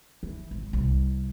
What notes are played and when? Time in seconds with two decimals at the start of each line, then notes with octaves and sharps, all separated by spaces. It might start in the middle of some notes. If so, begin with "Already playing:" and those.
0.23 E3
0.51 G#1
0.73 C2